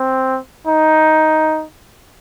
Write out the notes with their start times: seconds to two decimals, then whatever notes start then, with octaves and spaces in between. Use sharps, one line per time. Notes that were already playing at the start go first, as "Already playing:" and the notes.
Already playing: C4
0.67 D#4